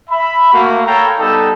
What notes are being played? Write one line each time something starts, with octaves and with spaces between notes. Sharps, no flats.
E5 B5
A3 A#3 F#4
A4 C#5 F5 G5 A#5 B5
G3 B3 D#4 G4 A4